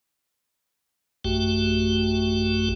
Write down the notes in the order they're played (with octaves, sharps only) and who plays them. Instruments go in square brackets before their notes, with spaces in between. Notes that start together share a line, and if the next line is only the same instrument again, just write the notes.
[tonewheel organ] A1 F#2 A3 F#4 G4 G5